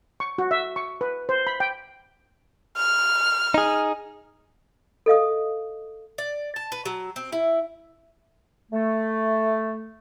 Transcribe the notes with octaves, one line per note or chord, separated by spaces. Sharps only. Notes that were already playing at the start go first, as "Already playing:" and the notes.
C#6
F#4
E5
C#6
B4
C5
B5
G5
F6
D#4 G#4
A4 D#5 F5 D#6
D5
A5
B4
F#3
C4
E4
A3